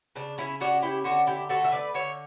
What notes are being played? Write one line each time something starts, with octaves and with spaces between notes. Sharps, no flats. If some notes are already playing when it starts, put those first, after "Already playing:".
C#3 D4
C#4 E4
C#4 D4 F#4
E4 G4
D3 D4 F#4
E4 G4
A3 F#4 A4
E5
B4 D5
D3 C#5 E5